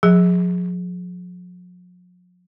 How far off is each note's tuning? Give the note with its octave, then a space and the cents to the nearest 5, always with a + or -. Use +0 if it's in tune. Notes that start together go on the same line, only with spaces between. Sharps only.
F3 +45 G#4 +0